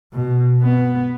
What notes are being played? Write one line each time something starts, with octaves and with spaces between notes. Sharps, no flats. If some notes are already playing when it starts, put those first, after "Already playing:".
B2
B3